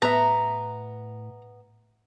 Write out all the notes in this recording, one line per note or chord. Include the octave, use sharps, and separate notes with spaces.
A2 B3 E5 A#5